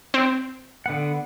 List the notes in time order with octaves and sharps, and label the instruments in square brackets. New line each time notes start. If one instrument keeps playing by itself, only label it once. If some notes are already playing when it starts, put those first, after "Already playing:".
[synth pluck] C4
[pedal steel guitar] D3 B3 F#5